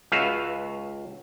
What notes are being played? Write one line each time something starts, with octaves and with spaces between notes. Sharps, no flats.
C#2 F#4 B4 E5 F5